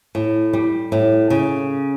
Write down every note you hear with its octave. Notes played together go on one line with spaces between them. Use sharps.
A2
G3
A2
C#3